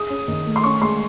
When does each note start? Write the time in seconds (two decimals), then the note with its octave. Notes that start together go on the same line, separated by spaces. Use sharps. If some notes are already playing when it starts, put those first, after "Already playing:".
Already playing: G#4 D#6
0.10 C#4
0.28 D#3
0.47 A3
0.56 C6
0.63 C#4 C#6
0.82 G#3 C6